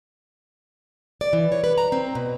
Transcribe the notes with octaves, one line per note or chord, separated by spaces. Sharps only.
D5
E3
C#5
B4
A#5
C4
B2